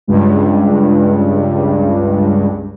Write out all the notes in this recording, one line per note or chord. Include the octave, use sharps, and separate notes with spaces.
C#2 G2